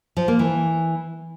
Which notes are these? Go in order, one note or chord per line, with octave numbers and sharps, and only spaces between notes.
F3
A#3
E3